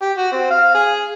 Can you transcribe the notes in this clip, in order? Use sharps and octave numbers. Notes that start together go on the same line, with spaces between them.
G4
F#4
C4
F5
G#4